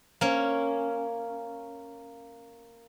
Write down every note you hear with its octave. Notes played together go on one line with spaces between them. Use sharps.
A#3 C#4